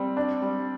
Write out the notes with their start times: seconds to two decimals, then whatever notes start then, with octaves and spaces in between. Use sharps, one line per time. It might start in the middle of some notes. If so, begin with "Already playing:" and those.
Already playing: G3 C4
0.17 D4
0.42 G3